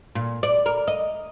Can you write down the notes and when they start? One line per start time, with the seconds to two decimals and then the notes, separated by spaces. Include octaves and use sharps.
0.15 A#2
0.43 D5
0.66 A#4
0.87 D#5